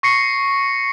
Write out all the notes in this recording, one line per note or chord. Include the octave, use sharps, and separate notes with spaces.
C#6 A#6 C7 C#7